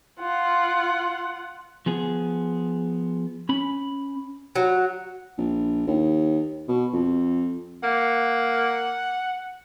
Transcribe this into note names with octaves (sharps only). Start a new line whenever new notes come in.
F4 F#5
F3 B3 G#4
C#4 B5
F#3
A#1
D#2
B2
F2
A#3 F#5